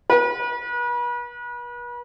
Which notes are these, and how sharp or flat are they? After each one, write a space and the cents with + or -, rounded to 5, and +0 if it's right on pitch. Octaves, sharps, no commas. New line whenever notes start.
B4 -40